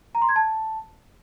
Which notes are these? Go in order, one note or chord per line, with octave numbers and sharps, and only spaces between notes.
A#5
C6
G#6
A5